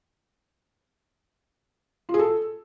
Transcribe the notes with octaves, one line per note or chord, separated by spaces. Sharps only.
F4
G#4
A4